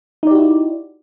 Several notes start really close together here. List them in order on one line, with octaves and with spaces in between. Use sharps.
D#4 D5 G4 F#4 E4